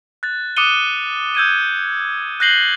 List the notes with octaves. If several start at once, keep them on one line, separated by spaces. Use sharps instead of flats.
F#6 A6
D6 D#6 F#6 C#7 D#7 G7
E6 G6 G#6 D#7
F#6 G6 A#6 C7 F#7 G7